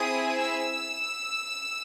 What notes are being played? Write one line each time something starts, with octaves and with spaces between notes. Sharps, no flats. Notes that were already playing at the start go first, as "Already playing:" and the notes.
Already playing: C4 E4 G#4 D#6
E6